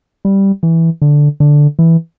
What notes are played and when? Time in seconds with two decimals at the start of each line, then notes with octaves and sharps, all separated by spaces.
0.25 G3
0.63 E3
1.02 D3
1.40 D3
1.79 E3